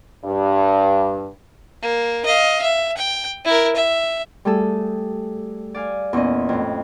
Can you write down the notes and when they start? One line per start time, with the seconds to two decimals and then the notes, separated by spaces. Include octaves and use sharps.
0.24 G2
1.82 A#3
2.25 D#5 F5
2.62 E5
2.97 G5
3.45 E4 A#4
3.76 E5
4.45 G3 A3 G#4 A4
5.74 D5 F5 G#5
6.13 E2 A#2 C#4 D#5
6.49 F2 A2